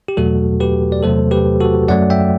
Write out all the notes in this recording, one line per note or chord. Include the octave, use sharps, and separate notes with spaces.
G4
E2 B2 F#3 A3 F#4 A4
G4 B4
D5
E2 C3 F#3 A3 A4 C5
G4 B4
F#4 A4
F#2 F#3 A3 D5 F#5
E5 G5